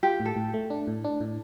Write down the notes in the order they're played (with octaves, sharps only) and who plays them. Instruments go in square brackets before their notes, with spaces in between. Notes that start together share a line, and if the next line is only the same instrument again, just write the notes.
[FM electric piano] F4 [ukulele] G4
[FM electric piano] A2
[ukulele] A4
[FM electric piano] A2
A3
D4
A2
D4
A2